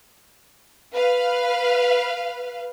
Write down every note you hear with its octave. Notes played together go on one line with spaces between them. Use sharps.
B4 F5